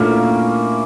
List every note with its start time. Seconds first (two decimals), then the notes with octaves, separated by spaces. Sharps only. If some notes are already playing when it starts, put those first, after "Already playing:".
Already playing: A#2 A3 A#3 C#4 D4 E4 F4 A4